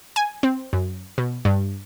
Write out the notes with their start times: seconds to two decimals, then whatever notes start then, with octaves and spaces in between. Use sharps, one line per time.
0.16 G#5
0.43 C4
0.73 F#2
1.18 B2
1.45 G2